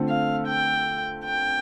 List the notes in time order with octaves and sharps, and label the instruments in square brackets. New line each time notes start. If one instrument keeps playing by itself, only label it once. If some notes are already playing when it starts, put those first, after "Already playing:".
Already playing: [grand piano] D3 A3 C4 F4 A4
[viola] F5
G5
G5